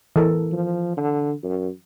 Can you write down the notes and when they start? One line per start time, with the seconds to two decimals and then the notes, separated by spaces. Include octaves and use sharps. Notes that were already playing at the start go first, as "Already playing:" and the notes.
0.16 E3 A4 A#4
0.52 F3
0.97 D3
1.43 F#2